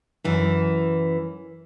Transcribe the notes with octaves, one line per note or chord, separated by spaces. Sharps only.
F#2 E3